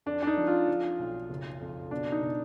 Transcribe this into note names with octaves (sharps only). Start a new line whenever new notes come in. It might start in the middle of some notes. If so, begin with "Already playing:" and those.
F2 D4
D4
D#4
F3
F4
F3
B1
F#1
F2
B2 D4
D#4
B2